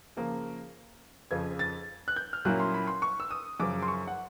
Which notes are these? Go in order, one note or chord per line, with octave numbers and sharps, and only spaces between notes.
C#3 F3 A#3
F2 C#3 F3 G#6
A6
F#6
G6
F6
A#2 F#3 A#3 C#4 E4 F#6
C6
B5
C6
C#6
E6
D#6
F#2 C#3 F3 D6
C6
C#6
F#5